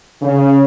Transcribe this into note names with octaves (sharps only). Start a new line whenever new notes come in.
C#3